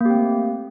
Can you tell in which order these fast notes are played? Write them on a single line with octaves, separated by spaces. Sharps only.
A#3 G4 C4 A3